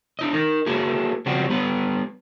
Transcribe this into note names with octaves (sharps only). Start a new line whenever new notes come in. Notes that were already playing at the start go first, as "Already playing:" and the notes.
D4 E4 D#5
D#4 A#4
A3 A#3 E4 F#4 G#4
C#3 F3 G3 C4 F#4
G3 B3 B4